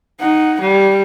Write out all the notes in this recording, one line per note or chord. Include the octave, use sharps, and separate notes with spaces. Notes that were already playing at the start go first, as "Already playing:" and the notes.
D#4 F#5
G3